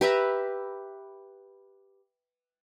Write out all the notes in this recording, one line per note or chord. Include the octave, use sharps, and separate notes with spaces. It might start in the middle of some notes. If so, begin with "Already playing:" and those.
G4 B4 E5 A#5